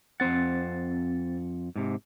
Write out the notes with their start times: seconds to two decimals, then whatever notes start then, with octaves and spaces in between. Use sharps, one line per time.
0.20 F2 C4 C5 F#5 A6
1.76 G#2 C3